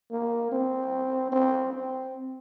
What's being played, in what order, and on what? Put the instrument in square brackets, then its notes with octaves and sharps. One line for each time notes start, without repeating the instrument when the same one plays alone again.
[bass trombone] A#3
C4
C4
C4